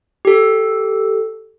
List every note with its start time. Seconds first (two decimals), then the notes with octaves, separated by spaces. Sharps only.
0.25 G4 A4